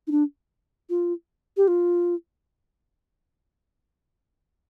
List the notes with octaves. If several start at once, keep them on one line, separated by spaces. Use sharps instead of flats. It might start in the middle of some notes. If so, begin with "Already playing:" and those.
D#4
D4
F4
G4
F4